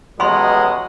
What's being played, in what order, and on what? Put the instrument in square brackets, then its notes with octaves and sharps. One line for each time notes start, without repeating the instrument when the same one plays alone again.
[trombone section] A1 B2 F#3 [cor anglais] G#3 [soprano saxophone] F#5 [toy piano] B5 C6